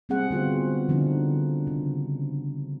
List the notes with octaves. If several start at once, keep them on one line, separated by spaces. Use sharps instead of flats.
G3 B3 C4 G#4 F#5
D3 B3 F4 F#4 C5
D3 F3 D4 D#4
C#3